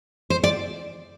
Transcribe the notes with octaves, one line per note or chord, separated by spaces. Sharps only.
C5
D5